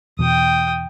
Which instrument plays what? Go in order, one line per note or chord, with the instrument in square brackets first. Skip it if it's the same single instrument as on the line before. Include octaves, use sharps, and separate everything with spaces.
[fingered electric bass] E2 B2 [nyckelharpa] G5 D#6